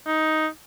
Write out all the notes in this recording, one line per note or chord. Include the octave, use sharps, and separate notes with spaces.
D#4